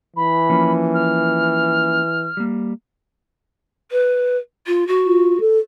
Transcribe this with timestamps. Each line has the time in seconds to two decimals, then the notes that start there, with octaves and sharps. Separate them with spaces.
0.16 E3 B5
0.50 F3 A#3 C#4
0.94 F6
2.37 G3 A#3
3.91 B4
4.67 F4
4.87 F#4
5.06 F4
5.40 A4